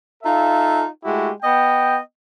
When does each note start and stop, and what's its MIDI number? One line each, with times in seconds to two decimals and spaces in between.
0.23 0.84 63
0.23 0.84 65
0.23 0.84 69
0.23 0.84 76
0.23 0.84 77
1.05 1.31 56
1.05 1.31 57
1.05 1.31 64
1.05 1.31 66
1.05 1.31 67
1.43 1.97 59
1.43 1.97 75
1.43 1.97 79